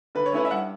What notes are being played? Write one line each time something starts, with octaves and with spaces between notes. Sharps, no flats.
D3 B4
C#5
A3 C#4 E4 B4
E5
G2 F#5